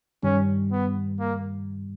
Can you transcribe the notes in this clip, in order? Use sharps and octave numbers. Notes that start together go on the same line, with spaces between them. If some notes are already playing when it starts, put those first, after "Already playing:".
G2 D#3 G3 C#4
B3
A#3